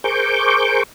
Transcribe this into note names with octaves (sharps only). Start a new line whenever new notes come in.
G#4 A#4 C5 C#6 D6 G6